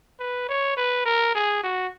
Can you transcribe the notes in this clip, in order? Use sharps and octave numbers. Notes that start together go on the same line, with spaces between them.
B4
C#5
B4
A#4
G#4
F#4